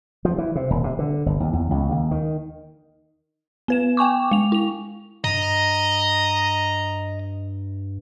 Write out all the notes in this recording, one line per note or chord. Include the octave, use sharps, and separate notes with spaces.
F3
E3
C3
D#1
C3
D3
G1
D#2
E2
C#2
D#2
D#3
B3 B4 E7
G5 G#5 C#6 D6
G#3 F7
E4 F7
G2 D#5 A#5